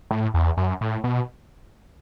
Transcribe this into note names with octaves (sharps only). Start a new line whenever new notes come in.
A2
E2
F#2
A2
B2